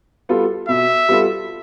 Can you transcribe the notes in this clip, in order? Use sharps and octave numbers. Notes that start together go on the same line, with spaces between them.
G3 B3 F4 A4
B2 E5
G3 B3 F4 A4